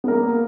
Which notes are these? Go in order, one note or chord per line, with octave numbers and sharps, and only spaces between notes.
A#3 B3 A#4